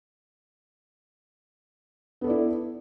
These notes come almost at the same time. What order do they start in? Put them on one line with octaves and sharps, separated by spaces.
B3 A4 D5 E4